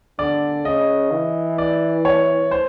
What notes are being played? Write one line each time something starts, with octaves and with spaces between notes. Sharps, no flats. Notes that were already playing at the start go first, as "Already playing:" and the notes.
D3 D5
C#3 D#5
E3
D5
C#5
C5